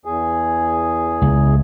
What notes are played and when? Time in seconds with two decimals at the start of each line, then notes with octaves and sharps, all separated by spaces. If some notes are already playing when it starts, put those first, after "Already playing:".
0.05 E2 G#4
1.22 C#2